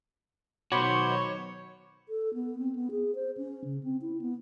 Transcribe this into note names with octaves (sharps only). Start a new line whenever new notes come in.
B2 D#3 F#3 F#4 C5 C#5 B5 D6
A4
B3
C4
B3
G#4
C5
C#4
C#3
C4
E4
B3